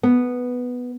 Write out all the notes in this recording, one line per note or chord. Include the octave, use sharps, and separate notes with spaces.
B3